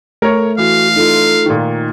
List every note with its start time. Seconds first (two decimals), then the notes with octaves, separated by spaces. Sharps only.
0.22 A3 A#4 C#5
0.58 E3 F#4 F5
0.96 D#4 F4 A4
1.46 A#2 D#3